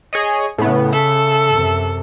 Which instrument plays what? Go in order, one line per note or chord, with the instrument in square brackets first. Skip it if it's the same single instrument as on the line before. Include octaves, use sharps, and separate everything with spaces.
[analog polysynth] G#4 C#5 D#5
[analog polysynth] A2 B3 [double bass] C#3
[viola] A4 [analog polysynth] E5
[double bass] F#2 C3